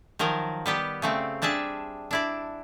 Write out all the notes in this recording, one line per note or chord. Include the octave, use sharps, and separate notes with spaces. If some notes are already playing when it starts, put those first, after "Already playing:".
D#3 F3 F#3 A#4
G3 B3 G4
C#3 A3 C4
G3 D4 G#4 E5 A5
D4 E4 D5